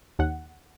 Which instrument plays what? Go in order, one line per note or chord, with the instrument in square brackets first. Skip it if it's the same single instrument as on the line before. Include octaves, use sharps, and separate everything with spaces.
[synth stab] D#2 F#5